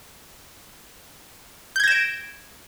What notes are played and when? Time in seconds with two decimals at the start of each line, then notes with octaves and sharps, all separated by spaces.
1.76 G6
1.80 G#6
1.84 A#6
1.88 E7
1.92 D7